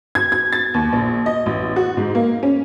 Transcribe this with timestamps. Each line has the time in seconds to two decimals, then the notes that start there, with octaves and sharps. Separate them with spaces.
0.15 G#6
0.32 G#6
0.53 A6
0.74 D#2
0.93 A#1
1.26 D#5
1.46 A1
1.76 F#4
1.97 G#2
2.15 A#3
2.43 C#4